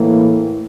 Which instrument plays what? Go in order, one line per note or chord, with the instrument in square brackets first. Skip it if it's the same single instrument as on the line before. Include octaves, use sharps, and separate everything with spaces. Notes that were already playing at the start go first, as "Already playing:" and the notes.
Already playing: [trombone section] A2 E3 A#3